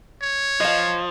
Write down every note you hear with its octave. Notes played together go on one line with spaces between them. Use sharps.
C#5
F3 D#5 F5